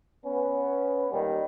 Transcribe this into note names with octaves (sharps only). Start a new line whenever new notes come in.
B3 C#4
D#2 A#2 D#3 G3